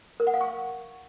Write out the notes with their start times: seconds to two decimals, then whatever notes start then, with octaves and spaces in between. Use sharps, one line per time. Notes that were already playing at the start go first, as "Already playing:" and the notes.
0.20 A#4
0.27 F#5
0.34 F5
0.41 C#6